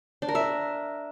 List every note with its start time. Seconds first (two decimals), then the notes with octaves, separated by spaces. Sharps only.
0.22 D4
0.28 A#4
0.35 E5